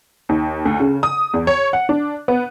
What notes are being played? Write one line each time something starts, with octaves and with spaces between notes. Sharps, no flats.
D#2
D2
C#3
D#6
E2
C#5
F#5
D4
B3